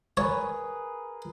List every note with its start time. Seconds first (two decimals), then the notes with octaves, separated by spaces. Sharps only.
0.17 G#4 A#4 B4 C#5